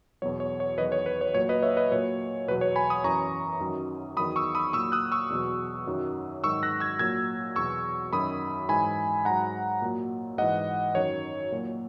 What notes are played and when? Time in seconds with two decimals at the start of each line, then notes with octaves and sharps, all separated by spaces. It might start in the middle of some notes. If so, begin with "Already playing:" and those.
0.22 E2 B2 F#3 C#5
0.40 C#5
0.60 C#5
0.78 E2 D#3 F#3 B4 D#5
0.92 C#5
1.06 B4
1.21 C#5
1.34 A#2 F#3 C#5
1.49 B4 D#5
1.62 C#5 E5
1.77 B4 D#5
1.91 A#2 F#3 C#5
2.48 E2 B2 F#3 B4
2.61 C#5
2.76 G#5 B5
2.90 B5 D#6
3.04 F#2 E3 A#5 C#6
3.60 F#2 D#3 F#3
4.17 E2 D#3 F#3 B5 D#6
4.36 C#6 E6
4.55 B5 D#6
4.73 A#2 C#6 E6
4.77 F#3
4.92 D#6 F#6
5.12 C#6 E6
5.30 E2 B2 F#3
5.87 F#2 D#3 F#3
6.44 G#2 D#3 F#3 C#6 E6
6.63 F#6 A#6
6.80 E6 G#6
6.99 A#2 F#3 E6 G#6
7.56 E2 B2 F#3 C#6 E6
8.13 F#2 D#3 F#3 B5 D#6
8.69 G#2 E3 G#5 B5
9.25 G#2 F#3 F#5 A#5
9.82 A#2 F#3
10.38 G#2 E3 D#5 F#5
10.95 F#2 D#3 F#3 C#5
11.52 A#2 F#3